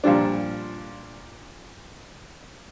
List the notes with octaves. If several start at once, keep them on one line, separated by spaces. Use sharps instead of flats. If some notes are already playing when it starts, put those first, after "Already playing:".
A#2 F3 G3 D4